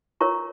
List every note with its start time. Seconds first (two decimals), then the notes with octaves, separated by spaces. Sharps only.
0.21 F4 A#4 C#5 A#5 C#6